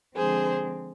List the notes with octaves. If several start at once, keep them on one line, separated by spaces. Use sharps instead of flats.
D3 F3 G#3 C4 G#4 C5